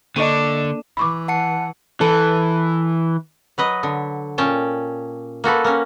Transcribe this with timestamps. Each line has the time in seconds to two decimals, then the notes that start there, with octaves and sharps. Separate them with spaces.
0.16 D3 A#3 D4 A4 D#5 C#6 D#7
0.97 E3 B5 C#6 D6
1.28 F#5 A5 C#7
2.01 E3 A4
3.58 F#3 B4 D#5
3.83 D3
4.38 A#2 C#4 G5 A5
5.44 A#3 F#4 A4 B4
5.64 A#3 C#4